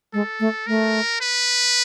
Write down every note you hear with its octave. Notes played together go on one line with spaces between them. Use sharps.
G#3 A4
A3
A3 A#4
B4